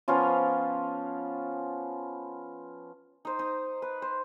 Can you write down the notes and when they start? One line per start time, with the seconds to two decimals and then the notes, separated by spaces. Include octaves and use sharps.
0.08 F3 B3 C#4 F4
3.25 D#4 C5
3.39 D#4
3.82 B4
4.02 C5